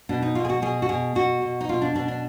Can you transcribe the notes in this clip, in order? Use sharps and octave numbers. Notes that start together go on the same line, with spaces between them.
B2 D4
D#4
B2 F4
G#4
F#4
B2 G#4
F#4
B2 G#4
B2 F#4
B2
D#4
B2 F4
D4
B2 D4
D4